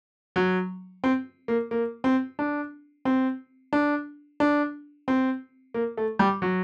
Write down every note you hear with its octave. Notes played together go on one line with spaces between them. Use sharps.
F#3
C4
A#3
A#3
C4
D4
C4
D4
D4
C4
A#3
A3
G3
F#3